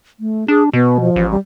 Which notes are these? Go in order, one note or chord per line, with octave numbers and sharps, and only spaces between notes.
A3
D4 G#4
B2 B3
F3
A1
G3